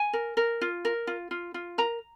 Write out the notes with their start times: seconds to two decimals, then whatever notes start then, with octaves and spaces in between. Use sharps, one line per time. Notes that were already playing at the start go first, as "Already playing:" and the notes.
Already playing: G#5
0.13 A#4
0.37 A#4
0.61 F4
0.85 A#4
1.07 F4
1.31 F4
1.54 F4
1.78 A#4 A#5